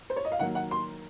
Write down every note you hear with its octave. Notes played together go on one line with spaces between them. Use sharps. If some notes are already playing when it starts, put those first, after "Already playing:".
C5
C#5
D#5
F5
D#3 F#3 A#3 F#5
F#5
C6